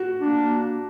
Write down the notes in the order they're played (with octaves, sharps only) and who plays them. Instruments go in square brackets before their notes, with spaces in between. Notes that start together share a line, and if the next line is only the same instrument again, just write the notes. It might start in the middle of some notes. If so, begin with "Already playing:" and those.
Already playing: [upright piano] F#4
[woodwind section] A#3 D4